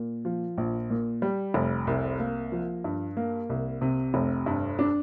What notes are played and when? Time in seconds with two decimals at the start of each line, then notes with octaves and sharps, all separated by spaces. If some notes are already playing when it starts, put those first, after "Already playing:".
Already playing: A#2
0.25 F3
0.58 A#1
0.90 A#2
1.22 G3
1.54 F1
1.87 C2
2.19 A#3
2.52 F3
2.84 G2
3.17 A#3
3.50 C2
3.81 C3
4.14 F1
4.46 G2
4.79 D4